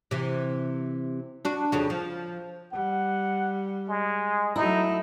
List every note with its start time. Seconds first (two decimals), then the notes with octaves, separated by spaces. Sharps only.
0.11 C3 E3
1.45 D4 F#4
1.72 F2 C#3 F#4
1.90 F3
2.73 G3 F#5
3.89 G#3
4.56 F#3 A3 D#4 E4